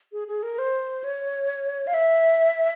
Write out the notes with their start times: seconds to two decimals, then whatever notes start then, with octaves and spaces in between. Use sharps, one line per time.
0.12 G#4
0.28 G#4
0.43 A#4
0.59 C5
1.04 C#5
1.87 F5
1.94 E5